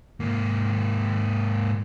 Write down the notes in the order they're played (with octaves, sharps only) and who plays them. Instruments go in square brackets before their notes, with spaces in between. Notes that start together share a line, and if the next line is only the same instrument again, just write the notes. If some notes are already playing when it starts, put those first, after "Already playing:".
[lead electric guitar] G#2 A#3